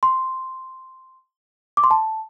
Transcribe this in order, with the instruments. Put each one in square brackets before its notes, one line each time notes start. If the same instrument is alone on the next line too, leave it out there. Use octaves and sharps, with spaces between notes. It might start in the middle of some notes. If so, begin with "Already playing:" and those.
[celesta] C6
D6
C6
A5